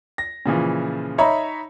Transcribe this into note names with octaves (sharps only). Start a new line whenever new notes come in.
A#6
A#2 C#3 E3 F3
D#4 C#5 E5 A#5 B5